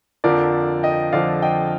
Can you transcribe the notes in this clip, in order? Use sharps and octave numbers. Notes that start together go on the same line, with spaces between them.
F2 D3 F3 A#4 D5
D#5 G5
F2 D3 F3 D5 F5
D#5 G5